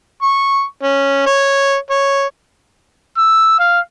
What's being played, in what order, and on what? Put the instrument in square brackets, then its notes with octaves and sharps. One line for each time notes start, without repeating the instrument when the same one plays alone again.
[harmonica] C#6
C#4
C#5
C#5
[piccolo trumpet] E6
F5